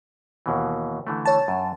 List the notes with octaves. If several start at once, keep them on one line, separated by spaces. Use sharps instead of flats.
D#2 B2 E3
D3 E3 A3
C#5 A5
F#2